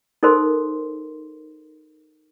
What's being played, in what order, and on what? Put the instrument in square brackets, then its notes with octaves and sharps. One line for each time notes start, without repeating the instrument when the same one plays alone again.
[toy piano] D#4 A4 A#4 C5 C6